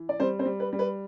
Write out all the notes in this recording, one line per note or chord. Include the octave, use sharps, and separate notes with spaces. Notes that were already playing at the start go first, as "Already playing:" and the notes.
Already playing: E3
D5
G3 C4 C5
C4 C5
G3
B4
G3
B4